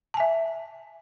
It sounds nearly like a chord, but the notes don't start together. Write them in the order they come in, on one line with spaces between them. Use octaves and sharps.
A5 G#5 E5